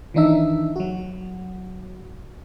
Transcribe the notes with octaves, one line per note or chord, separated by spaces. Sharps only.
D#3 E3 D4 D#4 E5
F#3 F#4